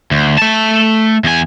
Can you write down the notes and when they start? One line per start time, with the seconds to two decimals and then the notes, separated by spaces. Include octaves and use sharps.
0.11 D2
0.38 A3 A5
1.24 E2 G#5